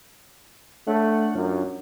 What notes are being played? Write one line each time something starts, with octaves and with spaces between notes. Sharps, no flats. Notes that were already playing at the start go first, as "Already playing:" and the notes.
A3 D4 C#5 F#5
F#2 F#3 D4 F4